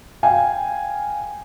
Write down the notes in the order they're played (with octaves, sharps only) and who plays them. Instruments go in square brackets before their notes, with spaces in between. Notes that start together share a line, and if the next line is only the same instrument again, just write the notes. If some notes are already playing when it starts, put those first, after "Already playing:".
[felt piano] F5 G5 G#5